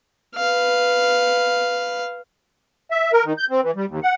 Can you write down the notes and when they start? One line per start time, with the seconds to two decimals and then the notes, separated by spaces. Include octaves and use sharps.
0.36 B4 F5
2.91 E5
3.12 A#4
3.25 D#3
3.38 G6
3.50 C4
3.63 E3
3.76 G3
3.88 D#2
4.03 F#5